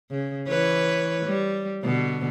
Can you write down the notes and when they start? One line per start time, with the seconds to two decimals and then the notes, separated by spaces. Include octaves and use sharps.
0.11 C#3
0.48 E3 B4 C#5
1.26 G3
1.83 B2 D3